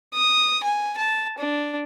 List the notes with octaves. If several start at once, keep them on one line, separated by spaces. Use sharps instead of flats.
D#6
G#5
A5
D4